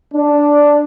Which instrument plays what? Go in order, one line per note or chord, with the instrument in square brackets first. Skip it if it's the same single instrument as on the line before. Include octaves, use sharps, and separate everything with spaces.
[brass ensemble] D4